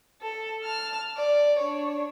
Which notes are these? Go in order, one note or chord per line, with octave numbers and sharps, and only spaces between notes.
A4
A5 F6
D5
D4 C#5